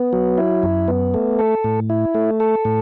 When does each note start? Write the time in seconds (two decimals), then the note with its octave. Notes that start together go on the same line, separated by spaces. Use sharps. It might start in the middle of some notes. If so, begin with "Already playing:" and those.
Already playing: B3
0.13 F#3
0.38 E4
0.63 F#2
0.88 B3
1.14 A3
1.39 A4
1.64 A2
1.90 E4
2.15 A3
2.40 A4
2.65 A2